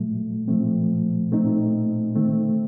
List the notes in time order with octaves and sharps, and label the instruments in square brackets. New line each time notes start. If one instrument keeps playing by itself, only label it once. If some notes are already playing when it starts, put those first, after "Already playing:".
Already playing: [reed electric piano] A#2 F#3 A3
A#2 F3 A3 C4
A#2 A3 C4 D#4
D#3 A3 C4